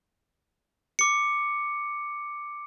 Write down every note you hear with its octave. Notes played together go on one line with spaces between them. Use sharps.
D6 C#7